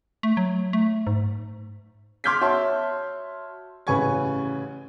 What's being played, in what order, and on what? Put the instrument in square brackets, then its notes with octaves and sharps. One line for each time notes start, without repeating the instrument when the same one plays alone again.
[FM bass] A3
F#3
A3
G#2
[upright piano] C6 D6 F6 G6 G#6 B6
F#4 C#5 E5 A5 C6
A1 C#3 B4 G#5 C#6 G#6